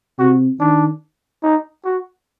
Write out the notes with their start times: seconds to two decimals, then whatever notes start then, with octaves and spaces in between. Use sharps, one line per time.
0.19 C3 F#4
0.60 D#3 D4
1.43 D#4
1.85 F#4